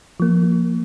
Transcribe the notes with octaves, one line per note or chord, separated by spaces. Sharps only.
F3 A#3